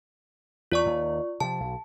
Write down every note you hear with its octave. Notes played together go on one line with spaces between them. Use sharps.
E2 F4 D5 C#6
D#2
C3 F3 A5
B1